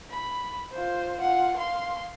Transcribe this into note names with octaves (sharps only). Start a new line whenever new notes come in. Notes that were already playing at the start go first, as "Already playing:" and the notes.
B5
F4 C5
F4 F#5
F5 C6